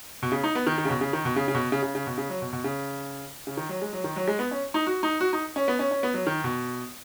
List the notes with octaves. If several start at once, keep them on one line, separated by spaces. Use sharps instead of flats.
B2
C#3
D#4
B3
D#3
D#3
C#3
B2
C#3
D#3
B2
C#3
C#3
B2
C#3
C#3
C#3
B2
C#3
F#3
B2
B2
C#3
C#3
D#3
F#3
G#3
F#3
D#3
F#3
G#3
B3
C#4
D#4
F#4
D#4
F#4
D#4
C#4
B3
C#4
C#4
B3
F#3
D#3
B2